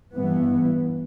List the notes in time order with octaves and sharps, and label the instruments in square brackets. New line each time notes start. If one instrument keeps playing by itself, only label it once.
[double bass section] G2 E3 B3